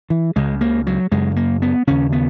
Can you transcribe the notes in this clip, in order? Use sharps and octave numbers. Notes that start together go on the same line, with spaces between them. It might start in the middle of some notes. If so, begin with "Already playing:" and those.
E3
C#2 C#3 G#3
A#3
F#3
F#2 C#3 G#3
A#3
B3
D#2 C#3 C#4
B3